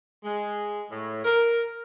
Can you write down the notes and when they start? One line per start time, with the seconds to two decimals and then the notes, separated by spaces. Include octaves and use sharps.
0.24 G#3
0.90 A2
1.24 A#4